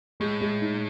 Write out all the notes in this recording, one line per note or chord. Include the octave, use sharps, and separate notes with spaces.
A2 G#3
G#3
D#4